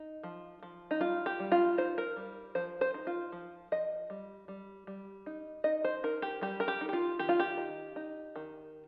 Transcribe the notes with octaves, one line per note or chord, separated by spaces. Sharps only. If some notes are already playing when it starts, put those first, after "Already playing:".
Already playing: D#4
F3
F3
D#4
G3 F4
G4
G3
F4
D#4 C5
A#4
G3
F3 C5
C5
D#4
F4
F3
F3 D#5
G3
G3
G3
D#4
D#4 D#5
C5
D#4 A#4
G4
G3 G4
A#4
G4
D#4
G4
F4
D#3 G4
F4
G4
D#4
D#4
D#3